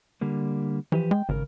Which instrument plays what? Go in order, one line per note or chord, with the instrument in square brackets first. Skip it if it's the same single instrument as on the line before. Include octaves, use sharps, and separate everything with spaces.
[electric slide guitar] D3 G3 A#3
[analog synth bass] E3 [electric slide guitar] F3 G4 B4
[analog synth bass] G#3 [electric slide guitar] G5
[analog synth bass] G#1 [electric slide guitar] C#3 A#4